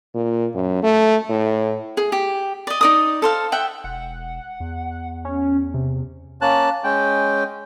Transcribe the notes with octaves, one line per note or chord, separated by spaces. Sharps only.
A#2
F#2
A3
A2
G#4
G4
D5 D#5
D#4 D5 D#6
A4 C5 F5
E5 F#5 G5
E1 F#5
E2
C#4
C3
A#3 C#4 A5 F#6
G#3 C#4 G5